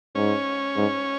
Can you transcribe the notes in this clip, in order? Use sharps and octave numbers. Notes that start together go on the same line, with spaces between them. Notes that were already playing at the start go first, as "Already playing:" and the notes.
G#2 C#4
G#2